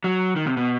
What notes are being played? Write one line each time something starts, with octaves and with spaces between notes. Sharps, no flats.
F#3
D#3
C3
B2